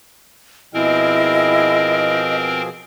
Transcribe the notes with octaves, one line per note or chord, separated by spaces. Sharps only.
B2 F3 C4 E4 G#4 A#4 D#5